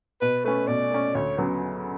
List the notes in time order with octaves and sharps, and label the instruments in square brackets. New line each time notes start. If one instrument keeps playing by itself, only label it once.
[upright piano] B2 [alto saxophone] B4
[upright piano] A3 C#4 [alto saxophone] B4
[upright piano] B2 [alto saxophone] D5
[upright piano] A3 C#4
[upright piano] D2 [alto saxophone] C#5
[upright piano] C#3 F#3 B3